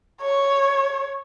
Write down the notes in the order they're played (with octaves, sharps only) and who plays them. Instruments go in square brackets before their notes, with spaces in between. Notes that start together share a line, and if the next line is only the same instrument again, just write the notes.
[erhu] C#5